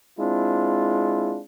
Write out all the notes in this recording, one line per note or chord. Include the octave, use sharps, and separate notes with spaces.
G#3 C4 D4 E4 F4